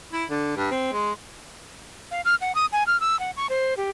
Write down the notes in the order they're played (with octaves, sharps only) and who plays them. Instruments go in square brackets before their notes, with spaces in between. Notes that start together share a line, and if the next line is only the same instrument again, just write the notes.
[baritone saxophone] E4
D3
G2
C4
G#3
[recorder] F5
F6
F#5
D#6
G#5
F6
E6
F#5
C#6
C5
G4